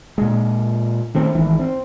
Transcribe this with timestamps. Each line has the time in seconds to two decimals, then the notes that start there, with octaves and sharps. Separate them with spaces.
0.18 A#2 G#3
1.14 D#3 A3 C4 C#4
1.35 G#1 D#3 E3
1.59 C4